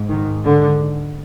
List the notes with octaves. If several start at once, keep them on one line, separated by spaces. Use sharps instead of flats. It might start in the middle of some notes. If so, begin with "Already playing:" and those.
Already playing: G#2
D#3
D3